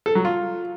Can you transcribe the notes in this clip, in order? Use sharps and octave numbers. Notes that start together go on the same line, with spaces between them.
A4
F#3
F4